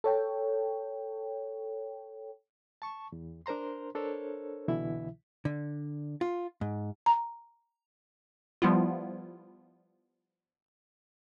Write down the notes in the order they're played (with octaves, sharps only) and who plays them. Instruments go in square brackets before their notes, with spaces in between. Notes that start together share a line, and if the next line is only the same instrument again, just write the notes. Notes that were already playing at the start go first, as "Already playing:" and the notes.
[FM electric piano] A4 C#5 G5
[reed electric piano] A5 C#6
E2
D4 A#4 C5 A#5 C6
D4 A4 A#4 C5 C#5
C2 B2 D3 E3 E4 E5
[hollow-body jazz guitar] D3
F4
G#2
[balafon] A#5
[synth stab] F3 G3 B3 E4 F4